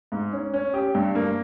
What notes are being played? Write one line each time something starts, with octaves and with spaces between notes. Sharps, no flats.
G#2
C#4
C#4
G4
G2
A#3